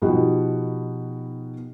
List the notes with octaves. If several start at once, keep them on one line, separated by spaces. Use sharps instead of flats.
B2 F3 B3 D#4 F#4 G4